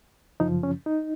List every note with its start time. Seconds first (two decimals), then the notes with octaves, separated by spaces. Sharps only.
0.40 F#2 C#3 F3 D#4
0.63 C#4
0.86 D#4